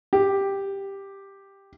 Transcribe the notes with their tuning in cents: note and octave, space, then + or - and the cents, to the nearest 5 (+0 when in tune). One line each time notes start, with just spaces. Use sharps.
G4 +5